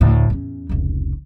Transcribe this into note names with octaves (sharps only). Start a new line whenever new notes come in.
D2 A2
E2 C#4
F1 C#2